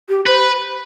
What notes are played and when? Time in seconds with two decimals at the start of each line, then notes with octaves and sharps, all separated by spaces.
0.09 G4
0.26 B4 C5